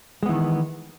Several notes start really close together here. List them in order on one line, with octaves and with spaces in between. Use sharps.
G#3 B3 E3 D#3